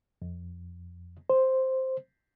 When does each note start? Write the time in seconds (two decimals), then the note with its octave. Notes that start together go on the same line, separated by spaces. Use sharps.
0.22 F2
1.30 C5